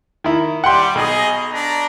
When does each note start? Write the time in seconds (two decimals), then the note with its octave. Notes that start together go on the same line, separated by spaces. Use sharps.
0.24 D#3 E4
0.64 G3 F#5 G5 C6
0.95 B1 G#4 D#5
1.52 D4 A#5